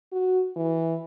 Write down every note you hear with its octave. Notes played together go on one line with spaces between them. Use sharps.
F#4
E3